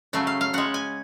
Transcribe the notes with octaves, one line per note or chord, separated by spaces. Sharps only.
C#3 F#3 A3 F5
F5
F5
C#3 G#3 F#5
G#5